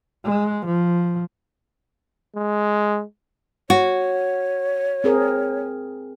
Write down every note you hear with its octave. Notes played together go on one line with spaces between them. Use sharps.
G#3
F3
G#3
F#4 C#5
C4 G#4 A#4